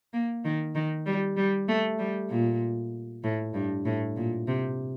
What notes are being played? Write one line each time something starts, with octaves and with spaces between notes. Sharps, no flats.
A#3
D#3
D#3
G3
G3
A3
G3
A#2
A2
G2
A2
A#2
C3